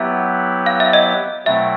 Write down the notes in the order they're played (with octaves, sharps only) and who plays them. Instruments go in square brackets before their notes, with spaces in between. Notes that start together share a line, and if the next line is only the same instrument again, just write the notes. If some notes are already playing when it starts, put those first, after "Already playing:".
Already playing: [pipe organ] F#3 B3 E4 G4 B4 [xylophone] E5
[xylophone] F5
E5
D#5
[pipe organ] B2 F#3 A3 C4 E4 [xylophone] E5